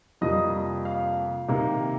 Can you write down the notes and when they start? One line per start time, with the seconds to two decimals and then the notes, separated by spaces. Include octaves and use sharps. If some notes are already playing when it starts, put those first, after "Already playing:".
0.21 F2 C3 G3 A#3 F4 D#5 D#6
0.85 F5
1.49 C3 D#3 A#3